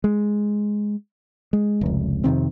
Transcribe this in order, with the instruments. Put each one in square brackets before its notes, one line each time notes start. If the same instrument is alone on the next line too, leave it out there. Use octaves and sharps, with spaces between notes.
[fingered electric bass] G#3
G#3
F1 C#2
F2 C3 D#3 C4